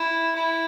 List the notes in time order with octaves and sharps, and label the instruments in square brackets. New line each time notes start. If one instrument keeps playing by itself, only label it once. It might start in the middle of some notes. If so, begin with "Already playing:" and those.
Already playing: [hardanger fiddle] E4
E4